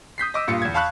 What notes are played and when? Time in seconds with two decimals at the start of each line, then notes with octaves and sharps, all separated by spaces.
0.18 D#6 G6 B6 C7
0.34 D#5 D6 E6
0.48 G2 A#2 F4 C#7
0.62 E2 G#6
0.74 F5 A5 B5 C#6 F#6